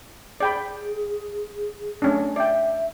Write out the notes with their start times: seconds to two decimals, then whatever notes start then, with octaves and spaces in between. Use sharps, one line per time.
0.40 G#4 D5 G5 B5
2.02 A3 C#4 D4
2.36 D5 E5 G5